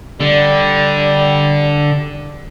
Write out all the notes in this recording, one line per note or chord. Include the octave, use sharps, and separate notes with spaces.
D3 G3 D5